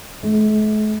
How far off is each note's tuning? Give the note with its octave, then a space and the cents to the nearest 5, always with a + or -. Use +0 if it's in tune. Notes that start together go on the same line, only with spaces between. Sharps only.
A3 -45